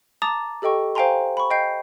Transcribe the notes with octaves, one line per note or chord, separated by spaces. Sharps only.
A5 A#5 D6 D#6 A6
G4 A4 D#5 G5 C#6
C5 F5 G5 G#5 A#5 C6
B5 C#6
D#5 G5 G6 C7